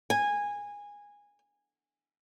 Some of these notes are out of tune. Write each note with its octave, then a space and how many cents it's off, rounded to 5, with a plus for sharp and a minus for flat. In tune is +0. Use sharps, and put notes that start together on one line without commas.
G#5 -15